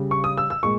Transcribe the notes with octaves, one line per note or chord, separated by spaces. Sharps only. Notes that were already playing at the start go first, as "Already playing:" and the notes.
Already playing: C#3 G3
C#6
D#6
E6
E6
A#2 G#3 C#6